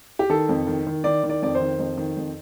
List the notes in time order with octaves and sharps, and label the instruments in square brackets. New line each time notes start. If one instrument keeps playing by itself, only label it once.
[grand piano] G4
D#3 A4
F2
D#3
D#3
D#3 D5
D#3
D5
F2 D5
C5
D#3
F2
D#3
F2